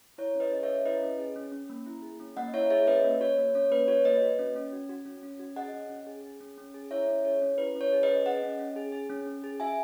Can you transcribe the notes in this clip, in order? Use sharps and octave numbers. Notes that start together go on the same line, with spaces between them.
E4 C#5
C#4
B4 D#5
G#4
C#5 E5
C#4
E4 B4 D#5
C#4
G#4
C#4
C#4
A#3
E4
G#4
C#4
A#3 D#5 F#5
E4 C#5 E5
G#4 C#5 E5
C#4 B4 D#5
A#3
F#4 C#5
A#3
C#4 C#5
A#3 B4
F#4 C#5
A#3 B4 D#5
F#4
C#4
C#4
F#4
F#4
C#4
C#4
F#4
G#4 D#5 F#5
C#4
C#4
G#4
G#4
C#4
C#4
G#4
E4 C#5 E5
C#4
G#4 C#5
C#4
E4 B4
C#4
C#5
G#4
B4 D#5
C#4
G#4 D#5 F#5
C#4
C#4
G#4
G#4
C#4
C#4
G#4
F#4 E5 G#5